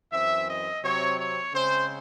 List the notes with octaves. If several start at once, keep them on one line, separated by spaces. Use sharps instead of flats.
F#2 E3 C4 E5
D#5
C3 F#3 C4 C#5
C#5
C#3 G#3 C4 C5